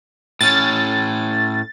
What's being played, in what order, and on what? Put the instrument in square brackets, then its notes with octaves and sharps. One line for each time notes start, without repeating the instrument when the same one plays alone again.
[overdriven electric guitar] A2 C#4 [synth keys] A6